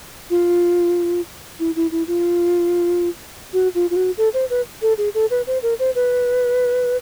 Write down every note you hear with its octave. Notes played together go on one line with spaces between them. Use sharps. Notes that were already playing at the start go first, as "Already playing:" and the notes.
F4
E4
E4
E4
F4
F#4
F4
F4
F#4
A4
C5
B4
A4
G#4
A4
B4
C5
A#4
C5
B4